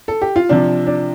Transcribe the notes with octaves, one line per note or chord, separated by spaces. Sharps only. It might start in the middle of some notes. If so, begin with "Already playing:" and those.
A4
G4
F4
C3 F3 D4
D4